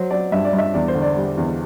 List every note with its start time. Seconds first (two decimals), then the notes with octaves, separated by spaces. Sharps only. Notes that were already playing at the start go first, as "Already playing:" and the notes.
Already playing: F#3 C5
0.10 F#3 D5
0.32 G2 E5
0.45 D5
0.53 G2
0.59 E5
0.74 E2 D5
0.88 C5
0.95 D3
1.02 D5
1.17 G3
1.37 E2